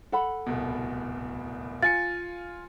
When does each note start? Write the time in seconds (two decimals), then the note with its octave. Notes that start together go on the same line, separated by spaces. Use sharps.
0.12 A4 F#5 B5
0.46 D1 C2 B2
1.82 F4 G#5 A6 C#7